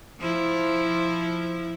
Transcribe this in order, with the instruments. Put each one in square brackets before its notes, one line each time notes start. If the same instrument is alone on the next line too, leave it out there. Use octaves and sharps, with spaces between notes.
[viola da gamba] F3 E4